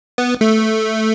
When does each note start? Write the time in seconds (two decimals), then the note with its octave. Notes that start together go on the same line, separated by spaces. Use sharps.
0.18 B3
0.41 A3